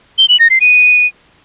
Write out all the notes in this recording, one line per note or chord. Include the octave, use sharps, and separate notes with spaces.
G7
F#7
A#6
C7
D#7